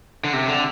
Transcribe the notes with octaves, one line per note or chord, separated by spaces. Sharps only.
D3
C3
D3